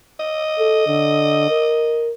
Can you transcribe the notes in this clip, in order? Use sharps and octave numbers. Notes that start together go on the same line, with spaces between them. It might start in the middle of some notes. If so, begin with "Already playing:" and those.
D#5
A4
D3
A#4